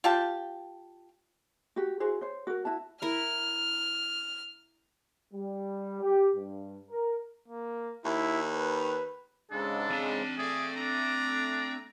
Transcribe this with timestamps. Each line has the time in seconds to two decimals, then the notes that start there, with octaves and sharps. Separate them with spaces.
0.04 F4 G4 G5 A5
1.76 F#4 G4
2.00 E4 F#4 G#4 C5
2.21 C5 C#5
2.47 F#4 A#4
2.65 E4 F#4 A5
3.02 E4 A#4 F6
5.33 G3
6.01 G4
6.34 G2
6.90 A#4
7.48 A#3
8.05 D#2 E4
8.54 B4
9.51 G#2 C#3 G#3 D4 A4
9.91 C4 A5
10.38 A3 G#4 D5
10.76 D4 A#5